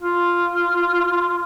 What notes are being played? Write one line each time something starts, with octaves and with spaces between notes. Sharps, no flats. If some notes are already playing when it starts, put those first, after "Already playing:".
F4